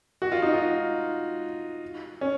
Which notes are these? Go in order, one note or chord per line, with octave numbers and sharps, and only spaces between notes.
F#4
F4
D#4
F4
C#4